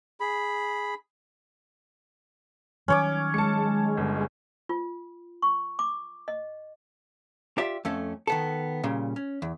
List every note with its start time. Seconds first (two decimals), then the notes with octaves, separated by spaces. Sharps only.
0.20 G#4 B5
2.88 D#3 F#3 G3 C#4 C#5 D6
3.34 G#3 A5 C#7
3.97 G1
4.69 F4
5.42 C#6
5.79 D6
6.28 D#5
7.58 F4 G4 D5 E5
7.85 F2 A3 C#4
8.27 D#3 B3 A4
8.83 A#2 C#3 G3
9.16 C#4
9.42 E2